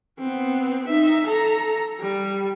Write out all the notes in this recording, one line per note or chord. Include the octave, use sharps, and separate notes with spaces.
B3 C4
D#4 E5
A4 A#5
G3